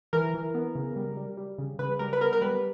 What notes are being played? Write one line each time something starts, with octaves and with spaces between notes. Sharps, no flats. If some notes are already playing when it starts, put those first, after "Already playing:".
E3 A#4
E3
B3
C#3
G3
G3
G3
C#3
C#3 B4
G3 A#4
B4
B3 A#4
A#4
G3 B4